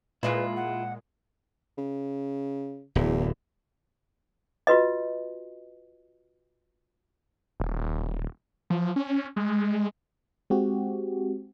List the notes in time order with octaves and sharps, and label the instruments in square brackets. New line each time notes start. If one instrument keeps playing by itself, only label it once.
[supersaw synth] A#2 G#3 [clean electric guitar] E4 F4 [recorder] B4
[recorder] F#5
[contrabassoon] C#3
[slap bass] D1 [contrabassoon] E2
[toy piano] F4 F#4 B4 D#5
[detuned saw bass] D#1
F3
C#4
G#3
[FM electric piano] G#3 C4 F#4 G4